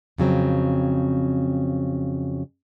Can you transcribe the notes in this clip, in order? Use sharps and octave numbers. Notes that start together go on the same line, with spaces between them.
F2 C#3 F#3 C4